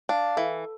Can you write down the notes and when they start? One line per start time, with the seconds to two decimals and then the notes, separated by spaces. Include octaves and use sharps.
0.09 D4 F5
0.37 E3 A4